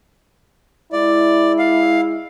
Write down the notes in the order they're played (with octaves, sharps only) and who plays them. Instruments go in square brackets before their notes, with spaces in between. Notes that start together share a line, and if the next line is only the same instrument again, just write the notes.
[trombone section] G#3 E4 [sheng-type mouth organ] D5
[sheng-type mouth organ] F5